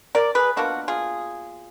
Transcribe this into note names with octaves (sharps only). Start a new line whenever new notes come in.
A#4 D5
G#4 B4
B2 A#3 D4 F4 F#4
F4 G#4